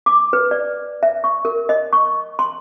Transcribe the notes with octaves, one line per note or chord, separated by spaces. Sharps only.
D6
B4
D5
E5
C#6
A#4
D#5
C#6
C6